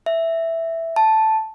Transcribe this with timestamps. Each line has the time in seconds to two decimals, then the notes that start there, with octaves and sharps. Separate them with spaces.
0.06 E5
0.96 A5